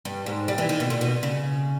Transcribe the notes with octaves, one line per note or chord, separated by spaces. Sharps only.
G2
G#2
G3
E3
D#3
B2
A#2
B2
C#3